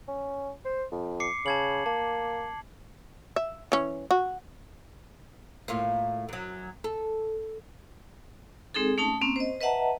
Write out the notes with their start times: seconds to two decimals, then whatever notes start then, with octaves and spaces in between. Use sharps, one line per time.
0.08 C#4
0.65 C5
0.92 F2
1.20 D6 C7 C#7
1.46 C#3 A5 G#6 F#7
1.86 A#3 A5
3.36 E5
3.72 E3 C#4
4.11 F#4
5.68 A2 A#3 F4
6.29 F#2 F#3
6.84 A4
8.74 G#3 C4 D#4 G#4 A4
8.98 A3 C#4 D#4 A5
9.21 A#3 C4 C#4
9.36 C5 D#5
9.61 B4 D#5 E5 F#5 A5 A#5